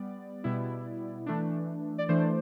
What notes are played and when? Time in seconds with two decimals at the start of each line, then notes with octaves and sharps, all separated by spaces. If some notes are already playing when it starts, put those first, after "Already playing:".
Already playing: G3 B3 D5
0.44 B2 G3 B3 E4
1.26 E3 A3 D4
1.98 D5
2.09 E3 A3 D4 C5